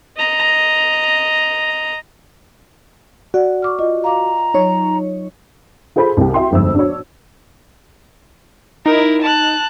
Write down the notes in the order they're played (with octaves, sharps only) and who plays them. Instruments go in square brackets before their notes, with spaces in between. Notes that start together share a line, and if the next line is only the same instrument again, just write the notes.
[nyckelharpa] D#5 A#5
[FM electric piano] F#4 [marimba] D5 F#5
[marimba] C#6 D6 F6
F4 D#5
[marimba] F5 D6 [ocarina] A#5
[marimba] F#3 [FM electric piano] D#4 C#5
[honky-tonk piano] F4 G#4 A4 C5 B5
C2 G4
F#4 E5 G5 C6
G1 F2 G#2 E6
D4 F#4 C#5
[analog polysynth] D#4 [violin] E4 A#4
[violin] A5 F#6